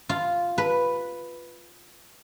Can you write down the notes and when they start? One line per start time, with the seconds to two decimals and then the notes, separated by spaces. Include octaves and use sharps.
0.09 F4
0.58 B4